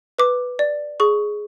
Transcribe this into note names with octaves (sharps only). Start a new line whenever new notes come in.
B4 D6
D5
G#4 C#6